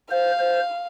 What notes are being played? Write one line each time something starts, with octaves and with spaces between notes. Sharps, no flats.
C5 F5
C5